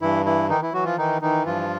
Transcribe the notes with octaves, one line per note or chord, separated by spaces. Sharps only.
G2 E3 E4
E3 E4
D#3 E3 D#4
E3 E4
E3 F#3 F#4
F3 F4
D#3 E3 D#4
D#3 E3 D#4
G2 F3 F4